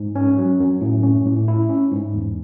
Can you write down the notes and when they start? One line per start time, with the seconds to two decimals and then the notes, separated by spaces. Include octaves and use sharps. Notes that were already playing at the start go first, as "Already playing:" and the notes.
Already playing: G#2
0.16 C#4
0.38 F#3
0.60 F#2
0.81 A2
1.03 C#4
1.26 A2
1.48 E4
1.69 C#4
1.91 G#2
2.14 E2